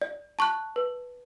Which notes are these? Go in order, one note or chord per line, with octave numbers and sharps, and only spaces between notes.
D5
A5 C#6 F#6
B4